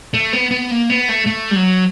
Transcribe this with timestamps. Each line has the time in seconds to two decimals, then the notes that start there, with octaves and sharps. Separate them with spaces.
0.14 A3
0.33 B3
0.51 B3
0.71 A#3
0.90 B3
1.09 A3
1.27 A3
1.51 G3
1.56 F#3